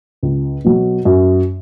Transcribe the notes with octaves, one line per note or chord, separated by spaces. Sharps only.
C#2
B2 F#3
F#2